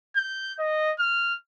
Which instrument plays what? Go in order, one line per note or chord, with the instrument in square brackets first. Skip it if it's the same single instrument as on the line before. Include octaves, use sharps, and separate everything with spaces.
[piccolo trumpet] G6
D#5
F6